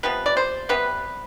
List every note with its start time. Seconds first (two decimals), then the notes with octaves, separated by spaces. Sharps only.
0.03 C3 F3 B3 B4
0.26 D5
0.37 C5
0.69 C3 G3 B3 B4